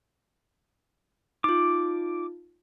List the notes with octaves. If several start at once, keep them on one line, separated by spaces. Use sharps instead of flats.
D#4 F4 D6